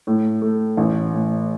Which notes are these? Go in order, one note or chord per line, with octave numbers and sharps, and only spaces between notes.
A2
A3
A1
A2